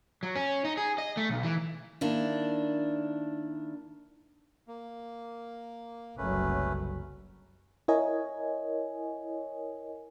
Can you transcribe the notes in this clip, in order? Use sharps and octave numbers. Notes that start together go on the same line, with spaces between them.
F#3
C#4
D#4
G#4
D#5
A3
B1
E3
D#3 A#3 D4 E4
A#3
F#1 C2 F#3 A3 C#4 B4
E4 A#4 C#5 D#5 G#5